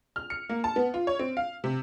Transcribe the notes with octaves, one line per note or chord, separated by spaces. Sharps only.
F6
C#7
A#3
A5
B3
F4
C#5
C4
F5
C3